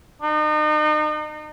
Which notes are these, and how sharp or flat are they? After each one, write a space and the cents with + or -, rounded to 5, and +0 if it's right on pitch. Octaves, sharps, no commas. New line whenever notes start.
D#4 -35